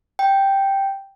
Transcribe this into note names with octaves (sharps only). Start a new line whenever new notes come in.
G5